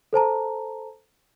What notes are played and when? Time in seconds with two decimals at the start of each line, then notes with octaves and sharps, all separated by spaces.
0.13 A4 C5 A5 A#5